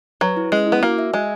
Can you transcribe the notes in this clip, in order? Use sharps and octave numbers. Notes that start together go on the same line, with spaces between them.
F#3 B4
E4
G#3 C#4
E4
B3
A#3 F#4
E5
G#3 G#5